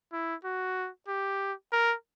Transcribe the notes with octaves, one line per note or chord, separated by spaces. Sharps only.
E4
F#4
G4
A#4